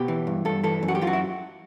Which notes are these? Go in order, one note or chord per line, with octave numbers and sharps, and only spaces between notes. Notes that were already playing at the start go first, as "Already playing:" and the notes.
Already playing: B2 G4
E3
G2
G2 A4
E3 A4
F#2
F#4
G4
F#2 F4
F#4
E4